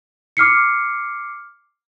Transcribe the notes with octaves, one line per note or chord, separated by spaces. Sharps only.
D6 F6 C7 C#7